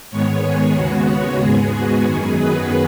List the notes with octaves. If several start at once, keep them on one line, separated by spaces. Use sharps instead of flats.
G#2 D#3 G#3 B3 C#5
G#4
D#2 C#3 G#3 B3 F#4
C#5
G#2 G#3 B3 G#4
F#4
F#2 D#3 F#3 B3 G#4
B4